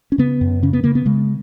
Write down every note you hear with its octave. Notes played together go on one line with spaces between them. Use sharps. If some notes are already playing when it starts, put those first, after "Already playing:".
C#4
C#3 B3
F#2
C#3 C#4
B3
C#3 A#3
B3
C#3 G#3